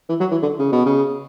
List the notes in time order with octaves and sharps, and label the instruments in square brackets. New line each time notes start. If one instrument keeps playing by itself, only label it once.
[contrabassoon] E3
F#3
E3
D3
C#3
B2
C#3